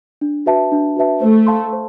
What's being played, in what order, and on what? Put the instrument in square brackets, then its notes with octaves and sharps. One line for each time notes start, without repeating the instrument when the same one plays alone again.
[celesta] D4
F#4 B4 E5 A5
D4
F#4 B4 E5 A5
[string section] A3 [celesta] C5
[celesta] F5 A5 C6
C5